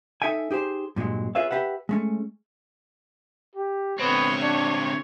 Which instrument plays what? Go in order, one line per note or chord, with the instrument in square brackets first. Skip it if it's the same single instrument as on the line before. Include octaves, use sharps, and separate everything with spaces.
[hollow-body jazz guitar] D#4 A4 E5 G5 G#5
D#4 G4 G#4 C5
G2 A#2 F#3 G#3
F4 G#4 B4 C#5 E5 F5
G4 G#4 B4 E5 F#5
G#3 A3 C#4
[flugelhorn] G4
[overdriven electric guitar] D3 C4 [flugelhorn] B3 [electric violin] C#5
[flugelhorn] D4